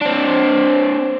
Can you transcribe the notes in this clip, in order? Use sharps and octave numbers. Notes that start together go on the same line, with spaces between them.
C4 D4